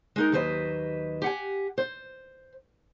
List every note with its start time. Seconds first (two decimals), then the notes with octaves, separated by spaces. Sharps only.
0.16 G#3 D#4 A#4
0.32 D#2 F#3 B4 C5 D#5
1.22 G4 F#5 G#5
1.78 C5